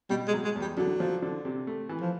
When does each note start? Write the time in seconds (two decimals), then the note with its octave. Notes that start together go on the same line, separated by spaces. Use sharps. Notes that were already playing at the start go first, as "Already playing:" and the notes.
0.10 B2 G3
0.28 G#3
0.33 F#3
0.45 G#3
0.56 E2
0.62 G3
0.77 D3 F#3
1.00 F3
1.22 D3
1.45 C3
1.67 A3
1.89 E3
2.01 F3